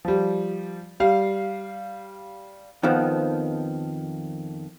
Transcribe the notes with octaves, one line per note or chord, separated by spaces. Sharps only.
F3 G3
G3 F5
F2 D#3 F3 B3